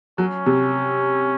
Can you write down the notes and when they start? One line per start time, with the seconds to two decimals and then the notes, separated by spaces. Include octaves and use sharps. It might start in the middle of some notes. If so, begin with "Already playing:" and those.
0.18 F#3 C#4
0.46 C3